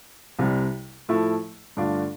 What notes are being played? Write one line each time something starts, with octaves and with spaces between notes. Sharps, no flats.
C2 C3 G3
A2 F3 A3 E4
G2 D3 A3 D4 F4